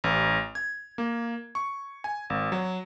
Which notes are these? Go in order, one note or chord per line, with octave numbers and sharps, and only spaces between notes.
A1
G#6
A#3
C#6
G#5
G#1
F#3